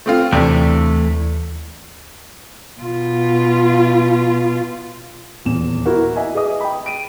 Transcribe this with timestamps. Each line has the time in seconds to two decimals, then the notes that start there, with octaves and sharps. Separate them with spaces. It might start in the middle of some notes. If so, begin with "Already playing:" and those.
0.06 A3 C4 F4
0.32 D#2 C3 E3 A3 D4
2.81 B2 F4
5.45 D#1 E2 E7
5.85 E4 F#4 A#4 F#5
6.16 D#5 E5 G#5
6.35 G#4 B4 D#5 D#6
6.61 G5 B5
6.86 D7 D#7